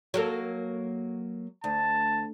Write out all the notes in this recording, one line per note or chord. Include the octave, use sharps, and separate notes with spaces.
F#3 A#3 A4
D2 A5